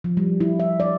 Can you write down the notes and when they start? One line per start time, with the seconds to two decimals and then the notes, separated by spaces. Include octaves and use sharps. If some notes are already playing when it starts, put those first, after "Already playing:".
0.04 F3
0.17 G3
0.40 E4
0.60 E5
0.80 D5